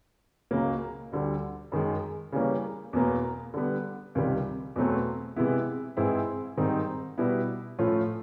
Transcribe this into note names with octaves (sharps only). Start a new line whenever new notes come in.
C#2 C#3 F#3 A#3
D2 D3 G3
F#2 D#3 G#3
C#3 E3 G3 A#3 C#4
E2 B2 F#3 A#3
D3 G3 B3
C#2 C3 D#3 G3
E2 B2 F#3 A3 C4
C3 E3 G#3 B3 E4
G#2 E3 G#3 C4 E4
G#2 D#3 G3 C4 D#4
B2 G3 B3 E4
A2 F3 A3 C#4 F4